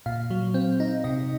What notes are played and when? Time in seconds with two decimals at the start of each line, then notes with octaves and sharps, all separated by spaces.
0.06 A#2 F5
0.30 F#3
0.54 C4
0.80 D#4
1.04 C3 D#5